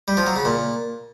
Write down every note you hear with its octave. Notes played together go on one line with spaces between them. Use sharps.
G3
F3
F#3
C#3
A#2